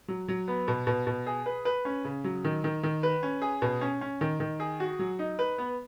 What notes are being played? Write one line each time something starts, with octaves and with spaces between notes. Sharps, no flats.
F#3
F#3
B3
B2
B2
B2
G#4
B4
B4
C#4
C#3
F#3
D#3
D#3
D#3
B4
C#4
G#4
B2
C#4
C#4
D#3
D#3
G#4
F#4
F#3
D#4
B4
B3